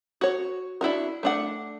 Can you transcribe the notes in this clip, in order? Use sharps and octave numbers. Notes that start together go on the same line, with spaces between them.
F#4 C#5
D4 E4 F#4 A#4
A3 D4 F#5